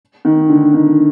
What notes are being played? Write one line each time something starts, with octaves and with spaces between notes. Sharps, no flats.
D#3
D3
D#3